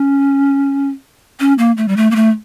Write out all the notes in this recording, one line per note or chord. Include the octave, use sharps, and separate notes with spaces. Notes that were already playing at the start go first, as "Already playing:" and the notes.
Already playing: C#4
C#4
A#3
A3
G3
A3
A#3
A3